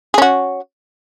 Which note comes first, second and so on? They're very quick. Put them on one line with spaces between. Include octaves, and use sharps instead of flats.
G#4 C#4 F#4